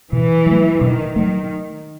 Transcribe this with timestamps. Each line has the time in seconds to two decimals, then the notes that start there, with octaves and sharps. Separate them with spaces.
0.13 B2 E3
0.46 F#3 A3
0.81 B2 D#3
1.16 D#3 F#3 A3